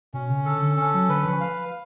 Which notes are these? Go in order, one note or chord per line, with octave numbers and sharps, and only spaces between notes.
B2 C#4
C#3
D3 A4
D3
C#4
F#3
D3 B4
F3
F5